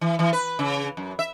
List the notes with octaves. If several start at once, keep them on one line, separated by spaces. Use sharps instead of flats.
E3
E3
B4
C#3
F#2
E5